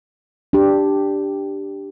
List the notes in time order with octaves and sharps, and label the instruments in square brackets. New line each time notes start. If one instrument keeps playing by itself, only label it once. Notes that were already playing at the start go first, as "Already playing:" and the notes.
[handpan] D4 G4